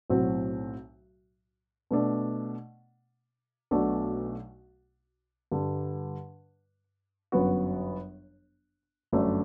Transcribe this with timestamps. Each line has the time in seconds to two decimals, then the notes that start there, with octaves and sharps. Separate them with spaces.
0.10 B1 A2 F#3 C4 F#4
1.91 B2 A3 D4
3.71 B1 B2 A3 D4 F#4
5.52 G2 D3 G3
7.32 G1 F#2 F#3 B3 F#4
9.13 G1 F#2 F#3 A3 D4